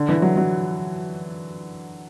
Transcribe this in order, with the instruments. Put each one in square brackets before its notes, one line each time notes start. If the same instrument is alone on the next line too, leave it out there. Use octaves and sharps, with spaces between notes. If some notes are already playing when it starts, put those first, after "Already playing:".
Already playing: [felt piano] D3
E3
F#3
F#3